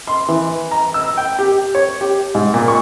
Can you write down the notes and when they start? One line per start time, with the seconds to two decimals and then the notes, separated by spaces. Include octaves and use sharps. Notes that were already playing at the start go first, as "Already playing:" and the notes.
0.07 C6
0.28 E3
0.71 A#5
0.94 E6
1.17 G5
1.39 G4
1.75 C#5
2.01 G4
2.35 G#2
2.54 A#2
2.68 C#6